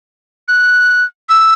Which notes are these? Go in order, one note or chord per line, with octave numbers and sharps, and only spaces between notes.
F#6
E6